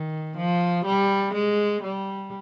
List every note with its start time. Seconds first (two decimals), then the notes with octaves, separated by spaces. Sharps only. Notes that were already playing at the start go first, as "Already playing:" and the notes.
Already playing: D#3
0.38 F3
0.85 G3
1.34 G#3
1.83 G3